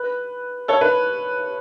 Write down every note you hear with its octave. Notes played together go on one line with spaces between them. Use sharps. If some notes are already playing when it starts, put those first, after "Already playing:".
Already playing: B4
A4 C#5
B4